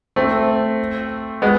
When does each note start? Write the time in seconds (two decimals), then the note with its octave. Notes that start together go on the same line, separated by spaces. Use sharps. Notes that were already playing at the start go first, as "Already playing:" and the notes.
0.16 A3 C4
1.42 G#3 B3